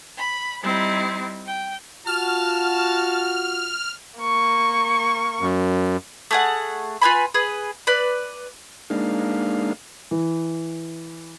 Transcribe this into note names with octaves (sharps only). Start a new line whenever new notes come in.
B5
G3 C4 D#4 E4
G5
F4 F#4 A5 F6
A#3 C#6
F#2
A3 G#4 F#5
F4 B4 G#5 B5
G#4 B4
B4 D5
G#3 A#3 D4 D#4 F5
E3